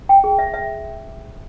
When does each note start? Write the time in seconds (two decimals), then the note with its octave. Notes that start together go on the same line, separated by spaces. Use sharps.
0.09 G5
0.24 G#4
0.39 E5
0.54 E5